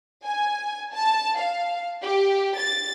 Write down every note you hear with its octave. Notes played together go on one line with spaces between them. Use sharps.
G#5
A5
F5
G4
A6